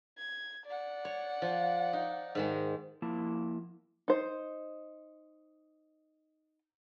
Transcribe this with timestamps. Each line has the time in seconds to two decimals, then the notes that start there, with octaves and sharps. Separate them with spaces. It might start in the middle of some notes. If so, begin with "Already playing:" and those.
0.18 G#6
0.66 D5 F#5
1.05 C#5
1.42 F3
1.93 D#4
2.35 G#2 D#3 G#3
3.02 F3 A#3 E4 A5
4.08 D#4 C5